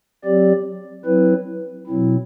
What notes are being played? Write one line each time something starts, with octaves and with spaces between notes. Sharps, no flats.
F#3 C4 G4 D5
F#3 C4 E4 B4
B2 F#3 C4 E4